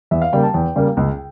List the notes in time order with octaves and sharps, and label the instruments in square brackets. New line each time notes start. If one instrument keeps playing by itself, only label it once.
[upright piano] E2 E5
F5
C#3 G3 A#3 G5
A5
E2 G5
C#3 G3 A#3
C#2